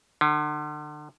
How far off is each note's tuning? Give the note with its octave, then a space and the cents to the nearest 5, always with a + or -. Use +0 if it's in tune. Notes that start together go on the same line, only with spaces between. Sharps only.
D3 +40